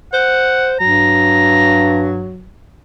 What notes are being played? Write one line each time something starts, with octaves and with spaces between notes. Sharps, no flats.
C5 F#5
G2 F#3 A#5